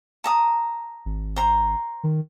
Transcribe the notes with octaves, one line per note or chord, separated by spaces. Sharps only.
A5 A#5 D#6
G#1
C5 A#5
D#3